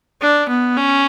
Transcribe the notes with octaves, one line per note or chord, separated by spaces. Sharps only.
D4
B3
C#4